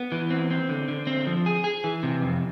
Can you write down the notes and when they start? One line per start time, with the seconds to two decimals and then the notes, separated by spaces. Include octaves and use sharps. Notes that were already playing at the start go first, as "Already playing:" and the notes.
Already playing: B3
0.12 E3
0.30 C4
0.51 C4
0.69 D3
0.88 D3
1.07 C4
1.27 F3
1.46 G#4
1.64 G#4
1.84 E3
2.03 C3
2.22 F2